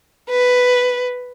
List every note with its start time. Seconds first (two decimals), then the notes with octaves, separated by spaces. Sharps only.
0.30 B4